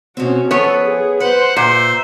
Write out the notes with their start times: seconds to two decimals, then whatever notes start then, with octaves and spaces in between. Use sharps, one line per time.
0.17 B2 C4 C#4 F#4
0.51 F3 B3 A4 C#5
0.85 G#4
1.20 B4 C5 F#5
1.56 A#2 C5 E5 F#5